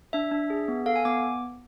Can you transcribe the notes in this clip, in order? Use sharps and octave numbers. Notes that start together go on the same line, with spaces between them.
D4 E5
D4
G#4
B3
A4 F5
G#5
B3 D6